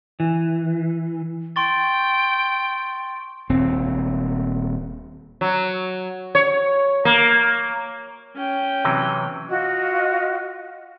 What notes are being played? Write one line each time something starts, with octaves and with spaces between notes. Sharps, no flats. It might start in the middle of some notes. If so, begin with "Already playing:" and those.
E3
G5 C6 C#6 A6
D#1 C4
F#3
C#5
A#3
C#4 G5
C3 E3 F#3
F4 F#4 D#5